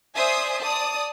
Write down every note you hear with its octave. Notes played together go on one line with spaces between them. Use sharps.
C5 D5 E5 G#5 D#6 C7
D5 A5 D#6